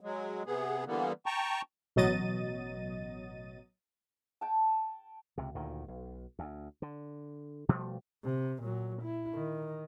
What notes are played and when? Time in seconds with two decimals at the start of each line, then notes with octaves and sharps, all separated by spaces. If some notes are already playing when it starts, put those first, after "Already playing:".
0.01 F#3 G#3
0.46 C3 B3 G#4
0.87 D3 E3 G3 A#3 B3
1.26 G5 A5 A#5 C#6
1.96 A1 B2 F#3 D#5 A6 D#7
4.41 G5 A5
5.38 C#2 C3
5.55 D2 A#2 D#3
5.88 B1
6.39 D2
6.82 D3
7.69 B2 F3 G3 A3
8.24 C3
8.63 A#2 F#3
9.03 E4
9.34 D#3